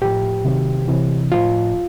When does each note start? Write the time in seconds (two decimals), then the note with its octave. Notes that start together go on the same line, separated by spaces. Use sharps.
0.01 A2 F3 G4
0.45 C3 D#3 F#3
0.88 C3 E3
1.32 A2 F3 F4